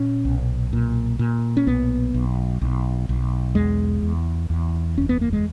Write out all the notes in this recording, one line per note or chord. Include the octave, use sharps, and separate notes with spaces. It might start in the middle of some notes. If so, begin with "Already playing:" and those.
Already playing: A#2 C#4
B1
A#2
A#2
C#4
B1 B3
B1
B1
B1
E2 G#3
E2
E2
F#1 C#4
B3
A#3
G#3